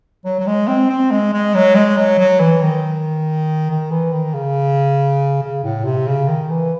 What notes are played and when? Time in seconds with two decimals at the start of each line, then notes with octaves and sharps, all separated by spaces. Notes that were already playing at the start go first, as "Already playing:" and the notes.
0.25 F#3
0.40 F#3
0.47 G#3
0.68 C4
0.90 C4
1.11 G#3
1.33 G#3
1.55 F#3
1.75 G#3
1.97 F#3
2.19 F#3
2.40 E3
2.62 D#3
3.70 D#3
3.91 E3
4.13 D#3
4.34 C#3
5.42 C#3
5.64 A2
5.85 C3
6.07 C#3
6.28 D#3
6.50 E3